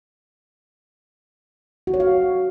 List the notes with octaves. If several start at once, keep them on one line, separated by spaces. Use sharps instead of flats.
F#4
C#5
F5